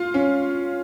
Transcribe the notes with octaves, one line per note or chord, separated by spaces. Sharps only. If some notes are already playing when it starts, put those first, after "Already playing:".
Already playing: F4
C#4